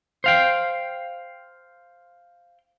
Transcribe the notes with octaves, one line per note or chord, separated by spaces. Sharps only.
C5 F5 G5